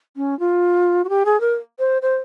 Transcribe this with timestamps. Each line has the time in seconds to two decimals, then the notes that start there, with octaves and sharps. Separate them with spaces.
0.16 C#4
0.39 F4
1.04 F#4
1.09 G4
1.25 G#4
1.40 A#4
1.79 C5
2.02 C5